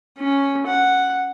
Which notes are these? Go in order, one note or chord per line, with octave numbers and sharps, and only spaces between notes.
C#4
F#5